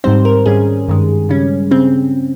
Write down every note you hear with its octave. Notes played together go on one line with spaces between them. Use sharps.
G#2 D#3 G3 C4 C5
A#4
G#2 G3 C#4 G#4
G2 D#3 G#3
C#3 G3 C#4
C#3 C4